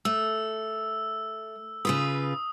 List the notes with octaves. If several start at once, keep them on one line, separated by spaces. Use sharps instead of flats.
A3 E6
C#3 F4 B4 D#6